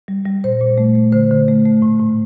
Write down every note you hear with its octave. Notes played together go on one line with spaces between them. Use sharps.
G3
G3
A#2 C5
A#2
A3
A3
D3 C5
D3
A3
A3
A2
A2